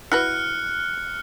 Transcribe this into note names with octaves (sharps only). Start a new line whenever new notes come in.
E4 F#4 B4 F6 F#6 C#7